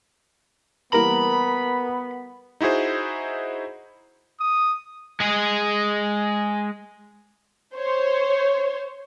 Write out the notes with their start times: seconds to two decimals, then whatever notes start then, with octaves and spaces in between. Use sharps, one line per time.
0.93 E3 G3 A#3 B3 A#4 A#5 B5
2.61 D#4 E4 F#4 G#4 C5
4.40 D#6
5.20 G#3 G#4
7.76 C5 C#5